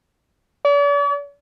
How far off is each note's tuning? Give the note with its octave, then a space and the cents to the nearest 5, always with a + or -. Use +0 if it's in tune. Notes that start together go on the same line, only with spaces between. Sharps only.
D5 -45